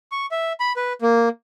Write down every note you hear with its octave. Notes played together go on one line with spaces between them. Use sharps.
C#6
E5
B5
B4
A#3